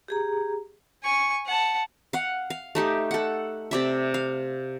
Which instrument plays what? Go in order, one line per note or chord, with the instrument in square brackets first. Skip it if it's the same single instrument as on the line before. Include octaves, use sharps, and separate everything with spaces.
[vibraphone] G4 G#4 A#5
[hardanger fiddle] G#5 C#6
F#5 A5
[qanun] F5 F#5
F5
A3 D#4 G4
A4 F#5
C3 D5 E5
F5